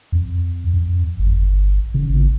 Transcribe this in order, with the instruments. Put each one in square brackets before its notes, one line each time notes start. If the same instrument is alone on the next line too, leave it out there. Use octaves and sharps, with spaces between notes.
[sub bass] F2
F2
G1
C#3
G#1